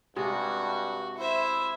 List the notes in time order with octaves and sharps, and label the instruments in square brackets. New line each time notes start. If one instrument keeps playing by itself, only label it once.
[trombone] G2 [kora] C3 G#3 [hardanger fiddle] F#4
[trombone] E4 [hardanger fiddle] C5 E5